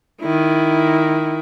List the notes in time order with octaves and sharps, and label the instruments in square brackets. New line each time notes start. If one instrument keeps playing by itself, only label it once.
[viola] D#3 E4